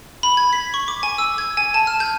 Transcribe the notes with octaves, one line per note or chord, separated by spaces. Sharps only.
B5
G#6
B6
C#6
D6
G#5
E6
G#6
G#5
A5
F6
G6